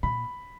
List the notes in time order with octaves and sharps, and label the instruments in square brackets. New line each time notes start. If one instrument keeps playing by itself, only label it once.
[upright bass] A#2 [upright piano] B5